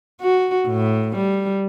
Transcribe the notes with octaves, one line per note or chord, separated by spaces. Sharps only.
F#4
A2
G3